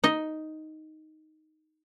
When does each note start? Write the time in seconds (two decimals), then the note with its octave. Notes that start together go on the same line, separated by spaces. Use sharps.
0.04 D#4 D#5